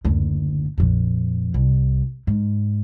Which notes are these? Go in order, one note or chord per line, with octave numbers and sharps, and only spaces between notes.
F#1 D2
A#1 F2
C2
G#2